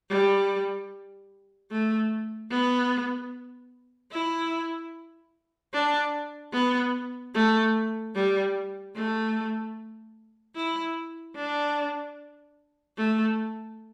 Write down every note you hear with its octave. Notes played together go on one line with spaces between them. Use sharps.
G3
A3
B3
E4
D4
B3
A3
G3
A3
E4
D4
A3